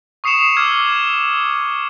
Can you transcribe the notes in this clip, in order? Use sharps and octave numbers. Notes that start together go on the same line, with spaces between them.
C#6 D#6 C7 C#7 E7 F7
D6 E6 F6 G#6